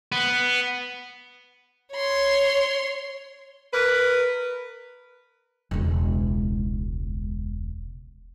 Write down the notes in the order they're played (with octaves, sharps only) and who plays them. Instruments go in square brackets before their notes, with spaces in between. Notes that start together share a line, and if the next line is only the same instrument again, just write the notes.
[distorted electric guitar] B3
[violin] C#5 C6
[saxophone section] A#4 B4
[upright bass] E1 C#2